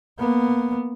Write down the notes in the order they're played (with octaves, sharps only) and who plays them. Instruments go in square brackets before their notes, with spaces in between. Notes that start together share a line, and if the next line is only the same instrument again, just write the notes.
[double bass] A#3 B3